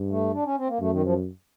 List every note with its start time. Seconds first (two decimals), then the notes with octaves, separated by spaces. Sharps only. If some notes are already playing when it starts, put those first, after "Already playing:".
Already playing: G2
0.11 A3
0.34 D4
0.45 C#4
0.58 C4
0.68 A#3
0.80 F#2 A3
0.92 D#3
1.03 F3